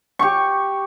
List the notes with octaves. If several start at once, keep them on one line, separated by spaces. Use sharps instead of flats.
G4 C#6